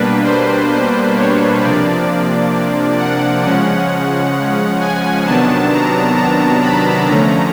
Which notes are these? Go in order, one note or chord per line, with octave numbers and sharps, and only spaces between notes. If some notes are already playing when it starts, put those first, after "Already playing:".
Already playing: B2 G3 A#3 D4 B4
C5
C5
C#5
C3 F3 A#3 D4 D5
F#5
C#3 F3 G#3 C#4 F#5
G#5
C3 D#3 F#3 B3 D4 A5
A#5
A#5
B5
D3 F3 A3 C#4 A#5